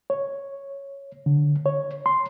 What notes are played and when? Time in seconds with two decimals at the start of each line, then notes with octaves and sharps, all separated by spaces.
0.10 C#5
1.26 D3
1.66 C#5
2.06 C6